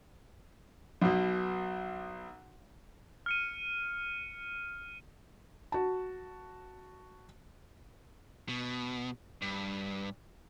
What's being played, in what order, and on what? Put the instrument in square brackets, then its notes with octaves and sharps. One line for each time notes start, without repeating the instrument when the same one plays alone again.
[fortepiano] B1 B2
[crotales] F6 C#7 D#7
[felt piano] F#4 A5
[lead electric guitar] B2
G2